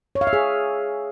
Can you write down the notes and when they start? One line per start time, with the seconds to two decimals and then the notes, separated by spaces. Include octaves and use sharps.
0.15 C#5
0.21 F5
0.27 E5
0.33 G#4